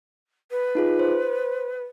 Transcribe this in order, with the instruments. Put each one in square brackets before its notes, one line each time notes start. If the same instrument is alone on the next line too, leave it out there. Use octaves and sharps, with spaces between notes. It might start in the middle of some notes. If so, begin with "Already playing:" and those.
[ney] B4
[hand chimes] D#4 F4 G#4
C5